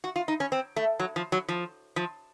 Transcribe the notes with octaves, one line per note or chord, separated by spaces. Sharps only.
F#4
F4
D#4
C#4
C4
A3
F#3
F3
F#3
F3
F3